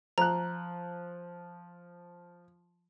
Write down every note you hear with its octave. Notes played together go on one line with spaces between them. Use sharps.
F3 A#5 F#6